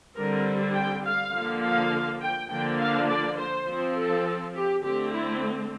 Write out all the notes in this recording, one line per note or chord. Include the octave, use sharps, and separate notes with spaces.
D3 G3 C4 A#4
G5
F5
D3 F3 A#3
F5
G5
D3 F3 A#3 D4 G5
F5
D5
C5
F3 C4
A4
G4
D3 A3 C4 G4
E4